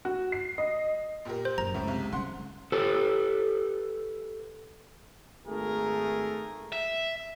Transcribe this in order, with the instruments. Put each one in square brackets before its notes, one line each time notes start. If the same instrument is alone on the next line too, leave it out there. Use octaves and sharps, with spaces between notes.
[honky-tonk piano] F#4
C7
D#5
A#2 G4 A#4
[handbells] C5
[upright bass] F#1 [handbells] A#5
[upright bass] C#2 [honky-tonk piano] A2 C#4 E4
[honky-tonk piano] B1 C3
[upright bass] C#3 G3 [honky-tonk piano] F#5 C6
[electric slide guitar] G4 A4 B4
[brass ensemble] G#1 A3 G#4 A#4
[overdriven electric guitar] E5